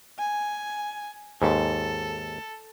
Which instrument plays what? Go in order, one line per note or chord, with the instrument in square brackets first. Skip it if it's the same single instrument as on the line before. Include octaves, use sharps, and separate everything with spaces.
[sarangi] G#5
[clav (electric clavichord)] D#2 G#2 [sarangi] A4